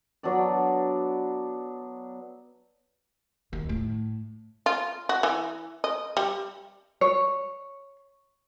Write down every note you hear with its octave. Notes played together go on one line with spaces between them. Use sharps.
F#3 B3 D4 D5
D#2
A2
F4
F#4
E3
D#5
G3
C#5